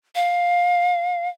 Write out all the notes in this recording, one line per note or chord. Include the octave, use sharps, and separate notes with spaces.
F5